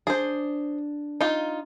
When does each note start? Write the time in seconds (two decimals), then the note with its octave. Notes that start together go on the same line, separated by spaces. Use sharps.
0.07 D4 G#4 C5
1.21 D#4 F4